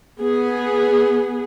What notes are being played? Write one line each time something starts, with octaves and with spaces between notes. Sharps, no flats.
B3 G#4